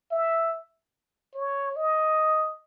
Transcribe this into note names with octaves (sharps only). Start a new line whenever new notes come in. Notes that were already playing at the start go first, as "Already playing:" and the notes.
E5
C#5
D#5